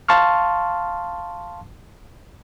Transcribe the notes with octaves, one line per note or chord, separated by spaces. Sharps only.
F5 A5 C6 C#6 F6